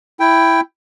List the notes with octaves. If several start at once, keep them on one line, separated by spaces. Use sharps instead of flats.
E4 G5